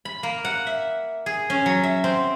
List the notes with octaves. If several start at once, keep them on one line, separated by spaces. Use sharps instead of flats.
B5
A#3
F#5
E5
G#4
C#4
F#3
E5
C4